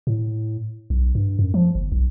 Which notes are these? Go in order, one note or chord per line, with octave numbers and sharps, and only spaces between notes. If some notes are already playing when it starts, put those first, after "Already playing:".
A2
B1
G2
F#2
F3
G1
B1